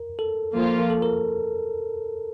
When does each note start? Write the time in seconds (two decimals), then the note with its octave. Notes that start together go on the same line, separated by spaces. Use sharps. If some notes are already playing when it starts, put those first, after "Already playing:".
Already playing: A#4
0.19 A4
0.55 F3 A#3 F4
0.90 A4
1.02 A#4